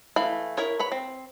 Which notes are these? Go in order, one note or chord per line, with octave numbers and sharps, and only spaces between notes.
E3 A3 F5 B5
E4 A#4 C#5
B4 C#5 B5
C4